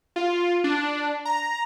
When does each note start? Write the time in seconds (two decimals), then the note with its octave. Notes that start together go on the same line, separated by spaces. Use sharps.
0.16 F4
0.64 D4
1.25 A#5